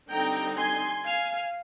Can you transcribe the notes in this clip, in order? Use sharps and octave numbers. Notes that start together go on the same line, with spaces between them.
D3 G3 C4 D#4 G5 A#5
G#5 C6
F5 G#5